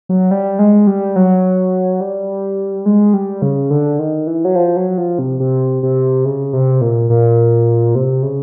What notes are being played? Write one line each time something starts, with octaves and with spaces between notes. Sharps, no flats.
F#3
G3
G#3
G3
F#3
G3
G#3
G3
C#3
D3
D#3
E3
F#3
F3
F#3
F3
C3
C3
C3
C#3
C3
A#2
A#2
C3
C#3